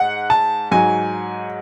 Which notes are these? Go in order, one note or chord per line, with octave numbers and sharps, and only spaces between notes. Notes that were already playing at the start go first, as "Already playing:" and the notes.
Already playing: G#2 F#5
A5
G#2 F#3 G#5